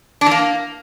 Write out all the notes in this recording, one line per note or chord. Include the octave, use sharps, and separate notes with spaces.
D4
E3
A#3